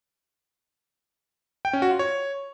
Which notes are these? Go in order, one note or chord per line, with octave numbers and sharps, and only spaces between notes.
G5
C#4
F#4
F4
C#5